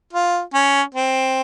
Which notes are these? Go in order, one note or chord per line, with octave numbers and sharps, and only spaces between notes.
F4
C#4
C4